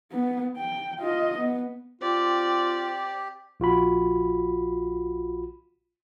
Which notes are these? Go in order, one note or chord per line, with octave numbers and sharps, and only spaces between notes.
B3
G5
F4 D#5
B3
C4 F4 G4 D5
A#1 F4 F#4 B5